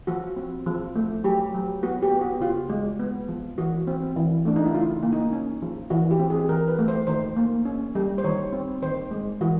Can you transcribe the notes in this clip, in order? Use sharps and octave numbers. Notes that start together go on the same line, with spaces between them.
F3 F#4
C4
F3
A3
F#3 G4
F#3
B3 F#4
G4
B3
F#4
C#3 F4
G#3
B3
F3
E3 F#4
C4
E3
A3 D4
D#4
E4
C#3 F4
A#3
D#4
C#4
F3
E3 F#4
G4
C4
G#4
E3 A#4
B4
A3
C5
D#3 C5
A#3
C#4
G3
C5
D#3 C#5
C4
D#3 C5
G#3
E3 F#4